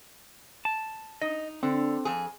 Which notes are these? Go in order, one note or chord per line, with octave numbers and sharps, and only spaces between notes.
A5
D#4 D#5
D3 C4
F2 G#4